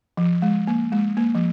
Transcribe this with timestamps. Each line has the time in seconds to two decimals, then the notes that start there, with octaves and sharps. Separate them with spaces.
0.17 F3
0.42 G#3
0.67 A#3
0.92 G#3
1.17 A#3
1.35 F3